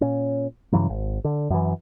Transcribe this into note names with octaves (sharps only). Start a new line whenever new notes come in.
A#2 C#4
G2 C#3 E3 F#3
G#1
D3
F#2 E3